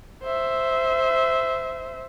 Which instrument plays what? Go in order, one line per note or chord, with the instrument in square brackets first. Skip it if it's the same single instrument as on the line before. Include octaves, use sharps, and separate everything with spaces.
[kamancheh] C5 E5